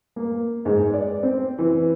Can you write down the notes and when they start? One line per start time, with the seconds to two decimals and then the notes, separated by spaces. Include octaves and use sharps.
0.16 A#3
0.65 G#2
0.94 D5
1.23 C4
1.58 E3